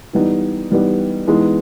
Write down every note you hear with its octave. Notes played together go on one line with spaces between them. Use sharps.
E3 G3 B3 D#4
E3 G3 B3 D#4
E3 G#3 B3 D#4